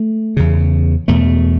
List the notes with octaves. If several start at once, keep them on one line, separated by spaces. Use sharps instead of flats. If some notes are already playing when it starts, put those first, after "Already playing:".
Already playing: A3
E2 C#3
E2 B2 A3